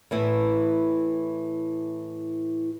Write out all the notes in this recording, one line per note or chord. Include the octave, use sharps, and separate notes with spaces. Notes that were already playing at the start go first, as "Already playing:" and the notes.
A2 E3 E4